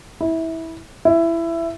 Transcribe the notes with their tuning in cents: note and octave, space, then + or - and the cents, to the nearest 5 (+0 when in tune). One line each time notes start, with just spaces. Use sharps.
E4 -20
E4 +15